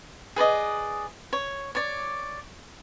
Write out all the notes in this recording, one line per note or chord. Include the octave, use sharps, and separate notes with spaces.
G#4 B4 D5 D#5
C#5
C#5 D5